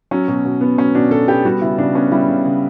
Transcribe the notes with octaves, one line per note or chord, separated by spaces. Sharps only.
F#3 C#4
B2
B2
B3
F#3 C#4
B2 D4
B2 A4
B3 G4
G3 F#4
C#3 E4
C#3 D4
B3 C#4
G3 E4
C#3
C#3